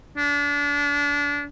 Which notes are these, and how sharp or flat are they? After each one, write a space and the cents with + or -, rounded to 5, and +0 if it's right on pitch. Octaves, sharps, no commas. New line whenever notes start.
D4 -30